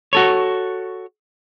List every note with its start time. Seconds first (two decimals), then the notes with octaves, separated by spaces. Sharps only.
0.13 F#4 A4 C#5